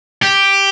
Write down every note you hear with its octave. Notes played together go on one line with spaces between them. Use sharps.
G4